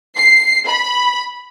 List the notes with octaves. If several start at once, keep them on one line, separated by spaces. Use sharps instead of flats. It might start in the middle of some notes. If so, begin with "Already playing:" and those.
C7
B5